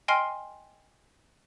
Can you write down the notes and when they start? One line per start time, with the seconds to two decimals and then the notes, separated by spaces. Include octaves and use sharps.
0.08 D#5 G5 G#5 C6 F6 C7